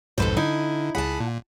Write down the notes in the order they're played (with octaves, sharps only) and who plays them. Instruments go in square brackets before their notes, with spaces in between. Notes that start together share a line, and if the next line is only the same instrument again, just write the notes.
[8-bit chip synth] B1 F2 G#2 [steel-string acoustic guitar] A4 B4 C5
[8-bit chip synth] D3 [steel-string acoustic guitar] D#4 E4
[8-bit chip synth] C#2 G#4 B5 [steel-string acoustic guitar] F#5 A5
[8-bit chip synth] A#2